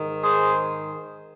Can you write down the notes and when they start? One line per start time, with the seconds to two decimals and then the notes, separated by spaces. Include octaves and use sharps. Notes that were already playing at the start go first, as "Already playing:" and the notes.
Already playing: G#2 D#3
0.22 G#4 C5